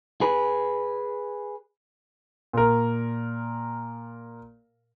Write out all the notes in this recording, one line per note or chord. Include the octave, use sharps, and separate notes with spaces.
G#4 B4
A#2 A#4